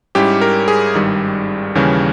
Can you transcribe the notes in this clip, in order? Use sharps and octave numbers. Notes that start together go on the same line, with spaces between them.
G#2 G3 C#4 E4 G4
A#4
G#4
G#1 G2 D#3 G3
D#2 C#3 E3 G3 C#4